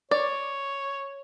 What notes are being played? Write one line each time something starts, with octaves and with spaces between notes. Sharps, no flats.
C#5 D5